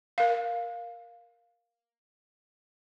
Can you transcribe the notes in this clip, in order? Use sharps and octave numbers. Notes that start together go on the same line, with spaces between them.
A#4 F5